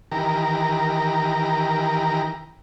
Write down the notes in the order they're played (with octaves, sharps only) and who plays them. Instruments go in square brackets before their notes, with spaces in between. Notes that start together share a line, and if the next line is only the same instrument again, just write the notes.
[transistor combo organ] D#3 E3 G4 A#4 A#5